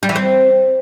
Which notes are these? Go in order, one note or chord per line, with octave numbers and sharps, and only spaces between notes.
G3
E3
C4